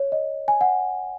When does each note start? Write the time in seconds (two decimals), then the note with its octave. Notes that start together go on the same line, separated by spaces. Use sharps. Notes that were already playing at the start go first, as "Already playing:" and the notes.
Already playing: C#5
0.12 D#5
0.48 G#5
0.61 F#5